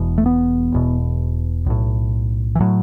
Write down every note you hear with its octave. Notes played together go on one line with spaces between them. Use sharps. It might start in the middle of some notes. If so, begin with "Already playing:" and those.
Already playing: E1 E2 B2
A3
B3
E1 E2 B2
B1 A2
E3
A2 F#3